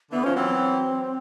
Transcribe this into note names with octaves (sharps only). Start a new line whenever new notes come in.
D3 E3 B3
D#3 F3 C#4
E3 F#3 C4